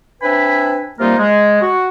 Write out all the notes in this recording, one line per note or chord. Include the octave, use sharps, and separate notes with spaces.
C4 D4 B4 E5 G#5 B5
C3 G3 A#3 D#4 F4 A#4
G#3
F#4